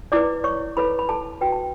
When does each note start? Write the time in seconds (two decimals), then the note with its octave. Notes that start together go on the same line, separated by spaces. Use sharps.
0.12 E4 B4 D5 D6
0.44 C#5 C#6
0.77 E4 A4 B4 C#5 B5
0.99 B5
1.09 A4 A5
1.41 F#4 B4 G5
1.52 A5